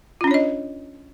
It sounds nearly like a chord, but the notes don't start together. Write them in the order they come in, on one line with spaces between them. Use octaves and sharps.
F4 C#4 D4 C#5 D#5